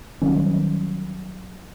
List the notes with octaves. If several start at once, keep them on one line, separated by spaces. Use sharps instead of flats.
D#3 F#3 G3 C#4